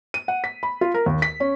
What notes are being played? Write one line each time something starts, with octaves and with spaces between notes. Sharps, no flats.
D#7
F#5
B6
B5
F4
A#4
D#2
B6
C#4